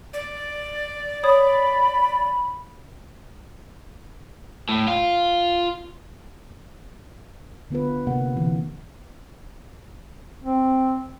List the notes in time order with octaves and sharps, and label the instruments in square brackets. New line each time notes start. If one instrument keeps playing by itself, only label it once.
[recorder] D5
[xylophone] C#5 D#6 [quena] B5
[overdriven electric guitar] A2
F4
[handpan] D3 B3 F4 B4
C3 A#3 F#5
B2 D3 E3
[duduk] C4